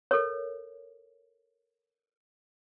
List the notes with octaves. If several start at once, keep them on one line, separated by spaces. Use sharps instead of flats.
A4 A#4 C#5